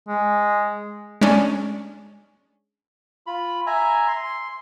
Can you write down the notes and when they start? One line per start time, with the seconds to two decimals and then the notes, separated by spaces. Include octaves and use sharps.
0.08 G#3
1.21 G#3 C#4 D4
3.27 F4 B5
3.67 E5 G#5 A#5
4.08 C6